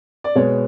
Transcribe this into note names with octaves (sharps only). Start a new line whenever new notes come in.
D5
B2 G#3 B3 C#5